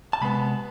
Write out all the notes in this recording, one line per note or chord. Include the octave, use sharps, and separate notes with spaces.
A5
C3 G#3 B3 B5